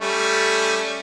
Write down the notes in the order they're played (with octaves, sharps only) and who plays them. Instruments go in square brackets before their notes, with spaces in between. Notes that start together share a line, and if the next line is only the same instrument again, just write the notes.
[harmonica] G3 A3 C#4